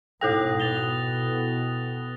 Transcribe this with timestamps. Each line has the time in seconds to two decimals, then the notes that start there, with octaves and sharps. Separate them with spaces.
0.21 G#2 B2 E4 A4 G5 D#6 F#6 A#6
0.60 B2 A6 F7 G7